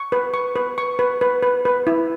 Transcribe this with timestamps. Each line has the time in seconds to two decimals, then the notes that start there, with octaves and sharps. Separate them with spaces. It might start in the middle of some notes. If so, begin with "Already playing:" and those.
Already playing: C#6
0.12 B4
0.34 C#6
0.56 B4
0.78 C#6
0.99 B4
1.21 B4
1.43 B4
1.65 B4
1.87 E4